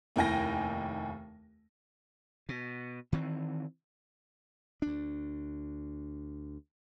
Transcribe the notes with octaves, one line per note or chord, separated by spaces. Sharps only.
F1 D#2 E4 G5 G#5 A#6
B2
D#3 E3 C4
D2 D4